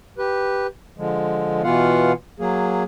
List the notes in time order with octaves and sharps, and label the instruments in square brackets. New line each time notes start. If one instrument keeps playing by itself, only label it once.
[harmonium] G4 B4
D3 F3 G#3
B2 E3 B3 F4 F5 F#5
F#3 A#3 G#4